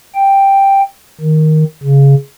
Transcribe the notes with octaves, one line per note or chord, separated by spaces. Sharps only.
G5
D#3
C#3